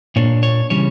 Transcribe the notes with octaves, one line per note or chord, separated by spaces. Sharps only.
A#2 A#3 D4 C#5
C#5
C#3 E3 G3 C#4 C#5